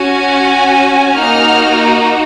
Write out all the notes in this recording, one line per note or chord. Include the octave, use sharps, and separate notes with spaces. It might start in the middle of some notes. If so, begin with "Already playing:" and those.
Already playing: C#4 F#4 G#5
A#3 D#4 F#4 F6